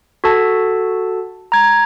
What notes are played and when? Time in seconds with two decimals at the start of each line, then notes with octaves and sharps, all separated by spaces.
0.24 F#4 A4 A5
1.52 A#5 G#6